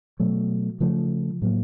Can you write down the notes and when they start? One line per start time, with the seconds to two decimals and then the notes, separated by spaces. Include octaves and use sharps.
0.20 B2 F#3 A3
0.80 C#3 F3 A3
1.42 A2 F#3 A#3